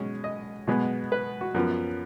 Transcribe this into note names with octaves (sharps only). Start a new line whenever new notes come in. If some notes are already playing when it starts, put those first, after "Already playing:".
Already playing: B2 G#3 C#4
D#5
B2 G#3 B3
B4
F#4
F#2 F3 B3